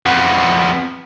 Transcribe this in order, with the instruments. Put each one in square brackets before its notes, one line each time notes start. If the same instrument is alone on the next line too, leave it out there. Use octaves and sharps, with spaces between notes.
[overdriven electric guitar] F2 B3